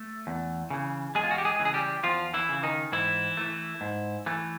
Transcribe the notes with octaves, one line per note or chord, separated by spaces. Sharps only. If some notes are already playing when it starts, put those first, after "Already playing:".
Already playing: A3
E2
C#3 E3
E2 G#3 G#4
F4
F#4
G4
G#3 G#4
C#3 E3
G#4
G3 G4
E2 F3 F4
E3 E4
C#3 E3
D#3 D#4
G#2 E3 E4
E3 A3
G#2
E3 A3